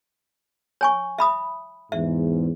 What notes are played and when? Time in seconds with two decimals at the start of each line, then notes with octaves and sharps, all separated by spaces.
0.81 C#5 G#5 C#6
1.18 E5 B5 D#6
1.92 E2 G#2 E5